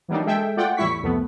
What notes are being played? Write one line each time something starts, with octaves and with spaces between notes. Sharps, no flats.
E3 F#3 G3 A#3 D4 D#4
G#3 G#4 A4 E5 G5
A3 F4 D5 F#5 G5
E2 A2 G3 E4 C#6 B6
C2 F2 A3 B3